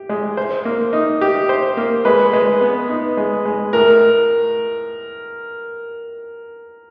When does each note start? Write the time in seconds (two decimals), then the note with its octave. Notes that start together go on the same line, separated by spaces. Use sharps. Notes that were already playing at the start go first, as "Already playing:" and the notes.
Already playing: G4
0.09 G#3
0.37 C5
0.65 A#3
0.93 D#4
1.21 G4
1.49 C5
1.77 A#3
2.05 G#3 B4
2.33 G#3
2.61 B3
2.89 D#4
3.17 G#3
3.46 G#3
3.73 A2 A#4